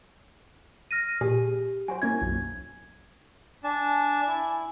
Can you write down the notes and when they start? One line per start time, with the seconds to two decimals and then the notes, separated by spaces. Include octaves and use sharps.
0.91 F6 A#6 D#7
1.21 A#2 G4 G#4 G#5
1.88 F#3 F#4 C5 G#5
2.02 A#3 C#4 E4 G#6
2.22 B1 F#2
3.64 D4 G#5 A5
4.27 E4